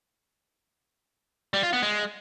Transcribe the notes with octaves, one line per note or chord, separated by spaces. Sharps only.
G3
F4
B3
G#3